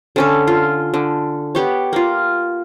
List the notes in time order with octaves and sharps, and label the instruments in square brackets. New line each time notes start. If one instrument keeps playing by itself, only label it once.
[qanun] D3 C#4 A4
F4
D3
B3 G4 C#5
A#3 F4